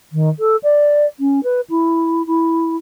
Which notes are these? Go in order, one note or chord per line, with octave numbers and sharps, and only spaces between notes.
D#3
A4
D5
C#4
B4
E4
E4